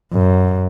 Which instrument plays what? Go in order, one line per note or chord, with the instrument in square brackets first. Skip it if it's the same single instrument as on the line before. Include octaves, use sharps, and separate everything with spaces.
[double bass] F#2